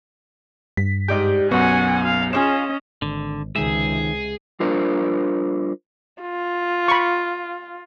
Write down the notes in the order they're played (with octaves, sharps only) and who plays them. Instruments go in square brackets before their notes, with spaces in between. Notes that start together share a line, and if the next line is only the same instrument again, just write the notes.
[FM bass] G2 [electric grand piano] B6
[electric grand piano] G#2 G6 [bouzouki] G4 D5 D#5
[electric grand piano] B1 F#2 [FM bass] B3 [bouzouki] F#4 [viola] F#5 G#5
[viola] F5
[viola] C#4 D#5 [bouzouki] F4 G4 G#4 [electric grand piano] E7
[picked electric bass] G#1 [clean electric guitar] D3
[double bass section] C#2 C3 [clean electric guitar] D#3 E5 [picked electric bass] G#3 [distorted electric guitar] G#4
[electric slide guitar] G3 D4 F4 A#4 C5
[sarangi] F4
[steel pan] B5 C#6